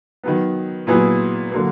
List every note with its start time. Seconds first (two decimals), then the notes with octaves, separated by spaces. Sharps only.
0.24 D#3 F#3 B3
0.87 A#2 F#3 B3 E4 G#4
1.51 D3 F#3 A#3